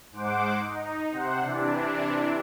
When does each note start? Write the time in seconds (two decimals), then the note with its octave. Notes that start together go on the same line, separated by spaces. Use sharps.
0.12 G#2 C5 F#5 D6
0.60 D#4
1.11 C3 C5 F#5
1.41 C3 E3 D4